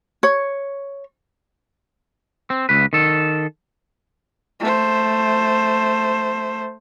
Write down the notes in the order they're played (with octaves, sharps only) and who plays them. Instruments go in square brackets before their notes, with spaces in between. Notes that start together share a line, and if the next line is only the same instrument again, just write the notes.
[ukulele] C#5
[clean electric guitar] C4
C#2 B4
D#3 A4
[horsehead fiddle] A3 C5